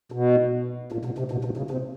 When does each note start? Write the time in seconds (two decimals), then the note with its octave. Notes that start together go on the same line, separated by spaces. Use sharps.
0.12 B2
0.92 A#2
1.05 B2
1.18 C3
1.32 B2
1.45 B2
1.57 C#3
1.71 C3